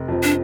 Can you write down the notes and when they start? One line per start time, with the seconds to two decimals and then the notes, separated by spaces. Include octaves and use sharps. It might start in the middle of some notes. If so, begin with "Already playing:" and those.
Already playing: F1
0.08 F2 F3
0.23 D4